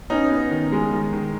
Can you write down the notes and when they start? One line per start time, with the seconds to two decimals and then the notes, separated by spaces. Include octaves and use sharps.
0.10 B3 C#4 D#4
0.31 B3
0.51 D#3
0.72 G#3
0.92 D#3
1.13 D#3